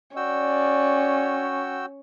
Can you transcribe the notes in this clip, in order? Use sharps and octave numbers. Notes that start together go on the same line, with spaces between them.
C#4 F#4 D5 G5 E6